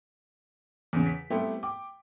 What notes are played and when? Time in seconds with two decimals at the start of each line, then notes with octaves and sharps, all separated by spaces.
0.93 E2 C#3
1.06 B6
1.30 G3 A3 B3 C4 E4 G4
1.63 G5 D6